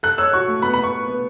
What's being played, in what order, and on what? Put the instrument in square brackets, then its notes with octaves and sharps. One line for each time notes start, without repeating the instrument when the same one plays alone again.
[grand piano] A4 [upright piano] F#6
[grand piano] C#5 [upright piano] E6
[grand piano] F#4 [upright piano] C#6
[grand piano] A3
[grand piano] B3 [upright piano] B5
[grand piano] B3 [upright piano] B5
[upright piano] C#6
[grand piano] B4
B3